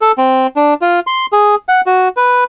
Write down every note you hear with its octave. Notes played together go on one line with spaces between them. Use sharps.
A4
C4
D4
F4
C6
G#4
F#5
F#4
B4